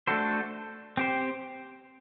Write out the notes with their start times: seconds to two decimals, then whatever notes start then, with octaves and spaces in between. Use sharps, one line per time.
0.07 A3 D4 F#4 A4 C5
0.97 C4 G4 C5